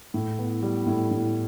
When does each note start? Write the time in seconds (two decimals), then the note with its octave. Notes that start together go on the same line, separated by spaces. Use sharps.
0.14 A2
0.39 B3
0.63 G3
0.86 A2
1.11 A2